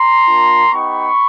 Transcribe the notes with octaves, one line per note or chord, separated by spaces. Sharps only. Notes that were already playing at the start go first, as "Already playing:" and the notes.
Already playing: A#5 C6
A#3 D4 F4
B3 D#4 G4 B5 C#6